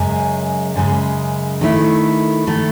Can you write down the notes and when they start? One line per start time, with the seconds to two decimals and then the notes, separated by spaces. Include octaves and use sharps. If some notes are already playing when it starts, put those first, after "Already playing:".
Already playing: F#2 C#3 G#3
0.76 F#2 C#3 G#3
1.61 D#3 A3 E4
2.47 D#3 A3 E4